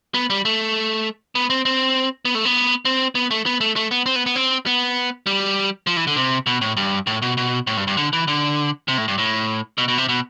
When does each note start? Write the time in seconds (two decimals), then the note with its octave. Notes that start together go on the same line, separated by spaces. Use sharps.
0.14 B3
0.30 G3
0.45 A3
1.35 B3
1.50 C4
1.65 C4
2.25 B3
2.35 A3
2.45 B3
2.85 C4
3.15 B3
3.31 A3
3.46 B3
3.61 A3
3.76 A3
3.91 B3
4.06 C4
4.16 B3
4.26 B3
4.36 C4
4.66 B3
5.26 G3
5.87 F3
5.97 E3
6.07 D3
6.16 C3
6.46 B2
6.61 A2
6.77 G2
7.07 A2
7.22 B2
7.37 B2
7.67 A2
7.77 G2
7.87 G2
7.97 D3
8.13 E3
8.28 D3
8.88 C3
8.98 A2
9.08 G2
9.18 A2
9.78 B2
9.88 B2
9.98 C3
10.09 B2